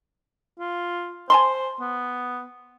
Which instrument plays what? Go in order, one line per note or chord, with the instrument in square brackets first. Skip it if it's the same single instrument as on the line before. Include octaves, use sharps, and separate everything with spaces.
[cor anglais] F4
[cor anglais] C5 [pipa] G#5 A5 C6
[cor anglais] B3